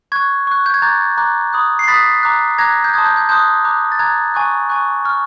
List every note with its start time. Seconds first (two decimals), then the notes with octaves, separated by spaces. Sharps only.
0.12 C#6 F#6 G#6
0.47 C#6 F#6
0.66 G6
0.74 G#6
0.82 A#5 D6 F#6 G6 A6
1.17 A#5 D6 F#6
1.53 B5 D#6 F#6
1.79 C7
1.88 B5 D#6 F#6 A6 B6
2.23 A#5 D6 F#6
2.58 A#5 D6 F#6 G#6 A#6
2.84 G6
2.94 A5 C6 D#6 F#6 G#6
3.06 G6
3.17 G6
3.29 A5 C6 D#6 F#6 G6
3.65 A#5 D6 F#6
3.92 A6
3.99 A#5 D6 F#6 G#6
4.35 G#5 C#6 F#6
4.69 G#5 C#6 F#6
5.05 C#6 F6